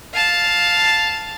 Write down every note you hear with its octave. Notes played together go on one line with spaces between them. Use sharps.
F5 A5